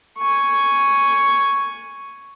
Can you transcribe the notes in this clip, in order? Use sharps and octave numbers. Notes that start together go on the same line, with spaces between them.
G#5 C#6